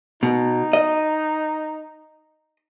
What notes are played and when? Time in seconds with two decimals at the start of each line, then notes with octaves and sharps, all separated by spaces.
0.23 B2 D#4
0.73 D#5